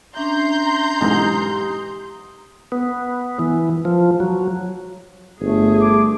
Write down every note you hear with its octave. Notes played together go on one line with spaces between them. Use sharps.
C#4 D4 E5 A#5 C6 G6
B1 G#2 E3 G4 D#6
B3
E3
F3
F#3
G1 A3 G#4
D6